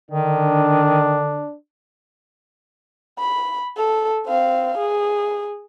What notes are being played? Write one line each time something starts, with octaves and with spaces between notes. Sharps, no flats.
D3 D#3 D4
B5
A4
C4 F5
G#4